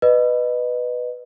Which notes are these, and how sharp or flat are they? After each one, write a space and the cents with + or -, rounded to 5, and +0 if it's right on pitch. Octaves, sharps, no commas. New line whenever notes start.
B4 +0 D#5 -25